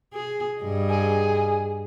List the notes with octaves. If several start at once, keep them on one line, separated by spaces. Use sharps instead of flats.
G#4
G2 D#5
G#4